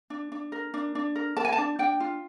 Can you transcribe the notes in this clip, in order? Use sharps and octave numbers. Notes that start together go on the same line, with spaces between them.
D4
D4
A#4
D4
D4
A#4
A#4 A5
G#5
A5
D4
D4 G5
F4